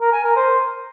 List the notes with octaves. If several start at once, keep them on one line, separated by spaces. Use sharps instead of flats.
A#4
G#5
A#4
C5